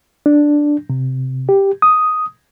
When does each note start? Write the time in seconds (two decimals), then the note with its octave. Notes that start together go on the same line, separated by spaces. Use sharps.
0.26 D4
0.90 C3
1.49 G4
1.82 D#6